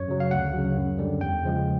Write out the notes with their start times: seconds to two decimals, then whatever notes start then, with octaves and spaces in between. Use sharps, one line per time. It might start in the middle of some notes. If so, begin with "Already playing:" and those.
Already playing: F#2 C#5
0.08 C#3 F#3
0.20 F5
0.31 D2 F#5
0.54 C#3 F#3
0.77 F#2
0.99 D3 G3
1.21 E2 G5
1.43 C#3 F3 G#3